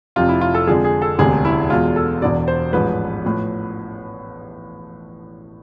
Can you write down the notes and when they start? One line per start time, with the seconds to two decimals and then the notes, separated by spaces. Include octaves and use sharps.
0.16 F1 F2 C3 F4
0.29 E4
0.41 F4
0.55 A4
0.67 F2 D3 F3 G#3 G#4
0.85 G#4
1.02 A4
1.19 E1 D2 C3 G#3 G#4
1.45 E4
1.70 E2 B2 G#3 F4
1.96 A4
2.22 E1 E2 B2 D5
2.48 C5
2.73 A1 G#2 F3 B4
3.25 A2 F3